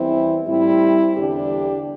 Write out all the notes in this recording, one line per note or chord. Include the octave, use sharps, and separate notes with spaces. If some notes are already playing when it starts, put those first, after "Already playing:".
Already playing: E2 E3 G3 C4 E4
A2 G3 C4 E4
E2 D3 G3 D4 G4